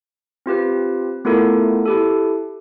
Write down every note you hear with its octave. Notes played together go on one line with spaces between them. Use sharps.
C4 F4 G4 B4
A3 B3 E4 F4 A4 A#4
E4 G4 A4